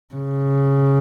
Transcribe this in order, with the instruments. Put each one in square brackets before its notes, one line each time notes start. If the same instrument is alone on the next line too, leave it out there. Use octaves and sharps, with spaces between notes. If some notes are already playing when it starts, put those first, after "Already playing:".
[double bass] C#3